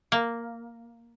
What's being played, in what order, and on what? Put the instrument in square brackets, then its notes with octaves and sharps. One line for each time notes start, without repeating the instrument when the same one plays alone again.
[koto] A#3